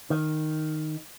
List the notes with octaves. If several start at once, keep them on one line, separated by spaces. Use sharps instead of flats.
D#3